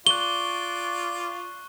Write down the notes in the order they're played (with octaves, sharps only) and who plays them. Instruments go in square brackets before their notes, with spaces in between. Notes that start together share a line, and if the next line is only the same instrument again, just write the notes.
[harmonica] F4 D5 [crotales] C#6 F#6 [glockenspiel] G7